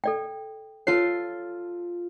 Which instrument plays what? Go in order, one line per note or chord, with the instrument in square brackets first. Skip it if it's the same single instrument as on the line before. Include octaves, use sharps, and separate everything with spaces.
[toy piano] A4 D5 G5
[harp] F4 A4 C7 [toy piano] C#5